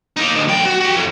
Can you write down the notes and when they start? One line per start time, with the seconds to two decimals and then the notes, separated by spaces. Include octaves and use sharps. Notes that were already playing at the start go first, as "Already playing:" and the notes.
0.17 A#3 D#4
0.34 D2
0.48 B1 G5
0.65 F#4
0.80 F#4 G4
0.97 F2